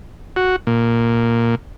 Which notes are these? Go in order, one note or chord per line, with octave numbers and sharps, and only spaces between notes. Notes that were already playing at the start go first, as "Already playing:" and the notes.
F#4
A#2